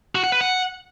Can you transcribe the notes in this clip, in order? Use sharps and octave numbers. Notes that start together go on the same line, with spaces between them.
F#4
F#5
B4
F#5